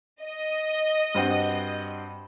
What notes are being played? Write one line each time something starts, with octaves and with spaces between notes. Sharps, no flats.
D#5
G2 C4 F#4